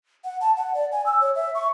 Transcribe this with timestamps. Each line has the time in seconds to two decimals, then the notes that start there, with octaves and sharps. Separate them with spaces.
0.24 F#5
0.41 A5
0.57 F#5
0.74 D5
0.92 G#5
1.06 E6
1.21 C#5
1.36 E5
1.55 C#6